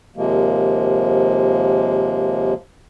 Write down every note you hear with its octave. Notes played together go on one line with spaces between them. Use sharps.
D#2 C3 F3 G#3 A#3